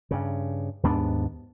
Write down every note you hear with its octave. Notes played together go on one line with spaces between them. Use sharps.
G2 C#3
D#2 G#2 B3 D4